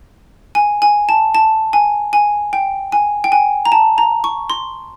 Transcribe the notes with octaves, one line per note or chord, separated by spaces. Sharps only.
G#5
G#5
A5
A5
G#5
G#5
G5
G#5
G5
G#5
A#5
A5
A#5
C#6
C6